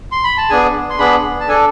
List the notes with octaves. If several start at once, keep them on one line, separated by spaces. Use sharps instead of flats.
C6
B5
A5
B3 D4 G#4 G#5
C6
B3 D4 G#4 B5
A5
D4 A4 G#5